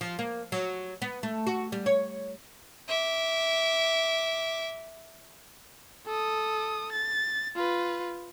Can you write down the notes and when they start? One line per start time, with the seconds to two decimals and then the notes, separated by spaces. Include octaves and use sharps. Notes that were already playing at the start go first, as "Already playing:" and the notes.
0.01 F3
0.19 A#3
0.52 F#3
1.02 B3
1.23 A3
1.47 F#4
1.72 G3
1.86 C#5
2.88 E5 D6
6.06 A4 D#6
6.92 A6
7.56 F4 B4